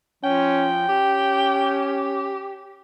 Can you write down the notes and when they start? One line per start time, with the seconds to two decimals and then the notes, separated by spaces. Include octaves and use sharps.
0.24 F3 C#4 G5
0.89 C#4 G4